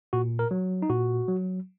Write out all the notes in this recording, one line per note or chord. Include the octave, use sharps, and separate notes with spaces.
A#2 F#4
A#4
F#3
D#4
A#2 F#4
F#3